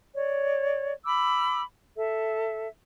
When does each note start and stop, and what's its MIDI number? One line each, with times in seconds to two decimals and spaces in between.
0.15 0.92 73
0.15 0.92 74
1.04 1.61 83
1.04 1.61 86
1.04 1.61 88
1.96 2.67 69
1.96 2.67 76